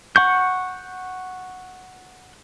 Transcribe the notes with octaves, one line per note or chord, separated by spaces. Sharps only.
F#5 C#6 G6